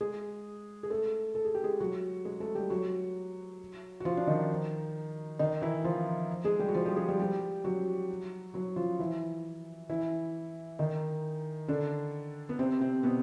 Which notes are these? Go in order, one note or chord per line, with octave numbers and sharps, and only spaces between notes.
G#3 G#4
G#4
A3 A4
A4
G#4
G4
G#3 G#4
F#3 F#4
G#3 G#4
A3 A4
G3 G4
F#3 F#4
F#4
F3 F4
D4
D#3 D#4
D#3 D#4
E3 E4
F3 F4
G#3 G#4
G3 G4
F#4
F3 F4
G3 G4
G#3 G#4
G3 G4
G3 G4
F#3 F#4
F#3 F#4
F3 F4
E3 E4
E3 E4
D#3 D#4
D3 D4
B3
C3 C4
C3 C4
B2 B3